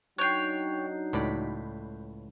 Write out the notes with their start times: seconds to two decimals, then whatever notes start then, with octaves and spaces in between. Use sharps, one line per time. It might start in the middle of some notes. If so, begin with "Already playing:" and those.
0.18 F#3 D4 D#4 C#5 G5 F#6 G6 C7
1.13 C#2 A2 D5 B5